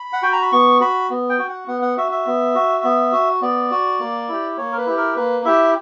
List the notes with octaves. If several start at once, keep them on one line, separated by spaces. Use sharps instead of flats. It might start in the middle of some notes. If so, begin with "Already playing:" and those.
Already playing: B5
F#5
F#4 G5
A#5
B5
B3 C#6
F#4 B5
B3
G5
F#4
F#5
B3 F#5
F#5
F#4 E5
E5
B3
F#4
B3
F#4
B3 D5
F#4
A#3
E4 G4
A#3 C#5
A#4
B4
E4 G4
A#4
A#3 B4
E4 G4 E5